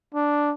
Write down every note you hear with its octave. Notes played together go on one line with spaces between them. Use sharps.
D4